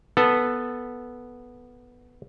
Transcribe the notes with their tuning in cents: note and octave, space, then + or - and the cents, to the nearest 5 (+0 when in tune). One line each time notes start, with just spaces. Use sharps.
B3 -5 A4 +0